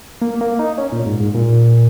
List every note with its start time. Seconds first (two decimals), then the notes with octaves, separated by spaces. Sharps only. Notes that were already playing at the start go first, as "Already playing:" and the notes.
0.21 A#3
0.41 A#3
0.59 D#4
0.78 C#4
0.92 A#2
1.06 G#2
1.20 G#2
1.34 A#2